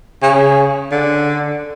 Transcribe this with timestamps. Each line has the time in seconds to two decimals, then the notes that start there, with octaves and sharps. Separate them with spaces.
0.22 C#3
0.92 D3